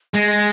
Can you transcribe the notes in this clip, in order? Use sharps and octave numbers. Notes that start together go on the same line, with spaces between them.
G#3 A#6